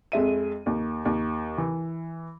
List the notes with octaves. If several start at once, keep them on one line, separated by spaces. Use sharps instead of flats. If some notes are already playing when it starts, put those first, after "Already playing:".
F2 G#3 E5 D#7
D#2
D#2
E3